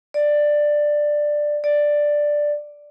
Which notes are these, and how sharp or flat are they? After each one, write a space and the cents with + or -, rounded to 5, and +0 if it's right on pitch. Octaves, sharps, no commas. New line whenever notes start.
D5 +10
D5 +5